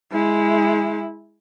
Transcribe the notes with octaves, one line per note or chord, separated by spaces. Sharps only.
G#3 E4